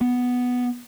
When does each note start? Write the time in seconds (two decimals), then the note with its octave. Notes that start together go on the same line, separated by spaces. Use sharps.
0.01 B3